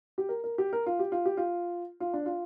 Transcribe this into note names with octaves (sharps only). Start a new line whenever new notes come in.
G4
A#4
A#4
G4
A#4
F4
G4
F4
G4
F4
F4
D4
F4